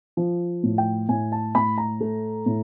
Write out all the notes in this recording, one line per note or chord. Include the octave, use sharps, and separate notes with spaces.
F3
A2
G5
A2 G#5
A5
A2 B5
A#5
A3
A2